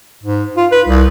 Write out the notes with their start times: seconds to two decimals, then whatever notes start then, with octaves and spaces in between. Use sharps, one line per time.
0.24 G#2
0.57 F4
0.72 B4
0.88 C2